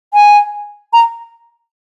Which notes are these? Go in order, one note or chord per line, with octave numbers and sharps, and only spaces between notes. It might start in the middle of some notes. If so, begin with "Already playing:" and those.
G#5
A#5